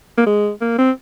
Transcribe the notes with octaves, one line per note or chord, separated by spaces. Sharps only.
A#3
G#3
A#3
C4